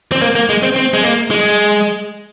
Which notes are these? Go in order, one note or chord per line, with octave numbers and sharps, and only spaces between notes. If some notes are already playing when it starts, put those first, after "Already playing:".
C4
A#3
A#3
G#3
C4
C4
G#3
A#3
G#3